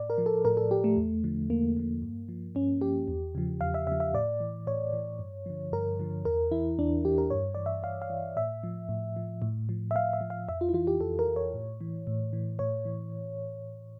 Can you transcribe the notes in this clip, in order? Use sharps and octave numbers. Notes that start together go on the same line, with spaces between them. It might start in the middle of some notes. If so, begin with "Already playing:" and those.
Already playing: A2 D5
A#4
F3
A4
A2 A#4
A4
F3 G4
A3
E2
D3 F3
E2 A#3
D3 F3
G2
F3
G2 C#4
F3 G4
E2
C#3 F3
E2 F5
E5
C#3 F3 E5
E5
A2 D5
E3
A2 C#5
E3
G2
D3 F3
G2 A#4
D3 F3
E2 A#4
E3 E4
E2 D4
E3 G4
A#4
G2 C#5
E3 D5
E5
G2 F5
F5
E3
A2 E5
F3
A2
F3
A2
F3
E5
A2 F5
E5
F3
F5
F2 E5
F4
E4
E3 F4
G4
F2 A4
A#4
E3
C#5
A2
E3
A2
E3
A2 C#5
E3